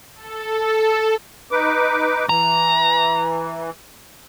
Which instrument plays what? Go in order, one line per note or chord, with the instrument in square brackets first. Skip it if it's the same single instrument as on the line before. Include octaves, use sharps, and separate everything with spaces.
[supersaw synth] A4
[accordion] D#4 B4 D6
[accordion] E3 [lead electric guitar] A#5